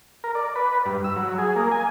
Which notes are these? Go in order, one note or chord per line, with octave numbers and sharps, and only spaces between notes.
A#4
D5
B4
G2
E6
F#3
G#4
A#3
G#5